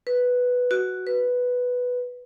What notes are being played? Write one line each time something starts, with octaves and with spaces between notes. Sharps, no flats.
B4
F#4
B4